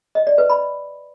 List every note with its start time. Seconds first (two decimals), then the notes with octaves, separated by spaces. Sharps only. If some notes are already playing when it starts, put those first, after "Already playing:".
0.15 D#5
0.27 D5
0.38 B4
0.50 B5